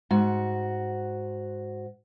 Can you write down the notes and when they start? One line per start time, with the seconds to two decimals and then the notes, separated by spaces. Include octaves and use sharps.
0.11 G#2 F#4